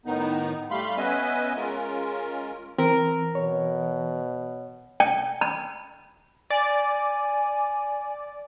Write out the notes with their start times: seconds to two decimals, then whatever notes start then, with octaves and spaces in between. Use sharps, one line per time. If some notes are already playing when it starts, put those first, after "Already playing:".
0.06 A2 D#3 B3 D#4
0.71 G3 A3 F5 B5 C6
0.98 B3 C#4 B4 D#5 E5 G#5
1.56 G#3 C#4 F4 A#4
2.78 E3 C4 A#4
3.35 B2 C#5
5.00 G5
5.41 B5
6.50 D5 G#5